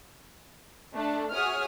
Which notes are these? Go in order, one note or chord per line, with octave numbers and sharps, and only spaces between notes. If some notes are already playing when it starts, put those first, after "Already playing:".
A3 D4 A4 D5
F#4 G#4 C#5 E5 D#6 F6